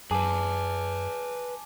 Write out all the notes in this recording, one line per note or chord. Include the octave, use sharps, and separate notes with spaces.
F#2 G#4 B4 G#5 A5 D6